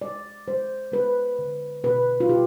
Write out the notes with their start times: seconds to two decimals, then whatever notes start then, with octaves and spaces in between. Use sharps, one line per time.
0.02 G#3 D5
0.47 G#3 C5
0.92 G#3 B4
1.39 D3
1.83 B2 B4
2.20 F4
2.29 B2 G4